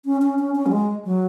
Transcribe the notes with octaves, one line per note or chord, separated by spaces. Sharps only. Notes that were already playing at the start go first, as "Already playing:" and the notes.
C#4
C#4
C#4
C#4
F#3
G#3
F#3